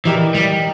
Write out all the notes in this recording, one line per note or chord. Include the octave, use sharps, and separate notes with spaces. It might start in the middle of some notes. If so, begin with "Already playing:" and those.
E3 D#4 G4 A#4 D5
G3